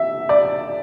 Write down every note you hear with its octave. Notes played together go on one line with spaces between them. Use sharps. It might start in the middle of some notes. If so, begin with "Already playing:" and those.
Already playing: E5
D5